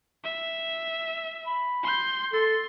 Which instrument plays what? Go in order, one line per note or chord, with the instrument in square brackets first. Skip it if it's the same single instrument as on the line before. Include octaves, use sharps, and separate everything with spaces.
[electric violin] E5
[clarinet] B5
[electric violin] C6 G6
[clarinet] A4 [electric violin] C6